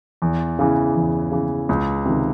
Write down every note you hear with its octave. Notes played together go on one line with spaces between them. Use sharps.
E2
C#3 E3
E2
C#3 E3
C#2
C3 D#3